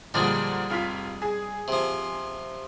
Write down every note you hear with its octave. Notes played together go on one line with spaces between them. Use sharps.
A#2 D3 F3 G3 G#3 D4
F1 F4 B6
G#4
C3 F3